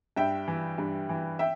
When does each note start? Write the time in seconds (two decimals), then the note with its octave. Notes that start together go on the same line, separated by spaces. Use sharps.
0.16 G2 E5 G5
0.48 E3
0.78 G2
1.09 E3
1.39 E5 G5